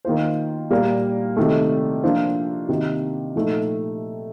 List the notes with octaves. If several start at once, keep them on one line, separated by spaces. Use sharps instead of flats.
D#3 A#3 F4 C5
A#2 G3 A#3
C3 D#3 A3
F3 A#3 D4 F4 C5
C3 D#3 A#3
A#2 F3 A3 D#4